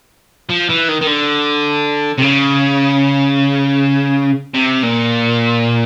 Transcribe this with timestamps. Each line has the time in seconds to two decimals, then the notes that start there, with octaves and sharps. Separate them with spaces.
0.49 F3
0.69 E3
0.89 D#3
1.01 D#3
1.07 D3
2.19 C3
2.23 C#3
4.54 C3
4.83 A#2